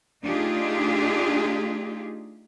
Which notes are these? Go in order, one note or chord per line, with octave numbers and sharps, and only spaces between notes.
A3 D4 D#4 F4 G4 G#4